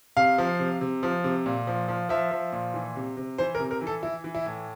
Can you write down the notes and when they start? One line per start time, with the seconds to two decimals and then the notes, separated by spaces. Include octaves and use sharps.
0.17 C3 F5
0.38 F3
0.59 C3
0.81 C3
1.03 F3
1.24 C3
1.46 A#2
1.67 F3
1.88 F3
2.09 F3 E5
2.31 F3
2.53 A#2
2.74 E3
2.96 C3
3.17 C3
3.38 E3 C5
3.55 A#4
3.60 C3
3.71 A#4
3.81 E3
3.87 A4
4.03 E3 E4
4.24 E3
4.35 E4
4.46 A2